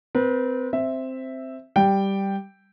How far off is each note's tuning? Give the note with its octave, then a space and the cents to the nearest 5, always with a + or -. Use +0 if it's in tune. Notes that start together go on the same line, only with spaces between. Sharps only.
C4 -25 B4 -40
C4 +0 E5 +0
G3 +0 G5 +0